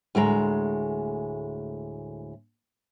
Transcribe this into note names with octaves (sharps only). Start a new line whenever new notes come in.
D2 A2 G#3 A#5